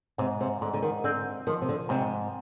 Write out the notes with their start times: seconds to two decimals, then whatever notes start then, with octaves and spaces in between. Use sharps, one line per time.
0.18 G#2 C3
0.41 C3
0.61 G#2 D3
0.74 D3
0.82 D#3
1.04 D3 C4
1.47 D#3 F3
1.62 C3
1.69 D3
1.89 G#2 C3